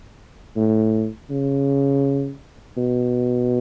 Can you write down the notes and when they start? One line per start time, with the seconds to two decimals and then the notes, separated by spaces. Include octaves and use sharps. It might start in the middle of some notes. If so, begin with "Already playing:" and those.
0.56 A2
1.30 C#3
2.77 B2